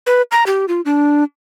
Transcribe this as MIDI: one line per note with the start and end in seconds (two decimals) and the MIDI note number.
0.07 0.22 71
0.32 0.44 82
0.46 0.66 67
0.68 0.81 65
0.85 1.24 62